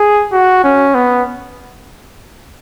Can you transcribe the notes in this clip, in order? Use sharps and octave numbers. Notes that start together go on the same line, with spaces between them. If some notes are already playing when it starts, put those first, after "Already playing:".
Already playing: G#4
F#4
C#4
B3